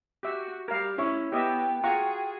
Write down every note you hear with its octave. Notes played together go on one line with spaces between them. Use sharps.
F#4 G4 E5
G3 A#4 F5
C#4 E4 C#5 C#6
B3 G4 D#5 E5 G5
F4 F#4 G#4 F#5 A#5 C#6